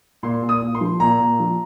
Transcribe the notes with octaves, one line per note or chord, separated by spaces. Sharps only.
A#2 C6
A#2
D#6
A#2
C6
F3
A#2 A#5
A#2
F3